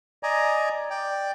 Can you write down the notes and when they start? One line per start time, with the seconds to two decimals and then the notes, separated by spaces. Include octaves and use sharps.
0.23 D5 D#5 G#5 A#5
0.90 D5 G5